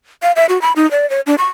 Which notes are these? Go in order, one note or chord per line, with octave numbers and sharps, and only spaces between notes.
F5
E5
F#4
B5
D#4
D5
C#5
D4
C#6